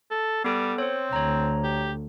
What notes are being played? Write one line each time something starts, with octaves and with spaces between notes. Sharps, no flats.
A4
G3 B3 A4 F#6
C4 C5 C#5
D2 C#5 A#5
G4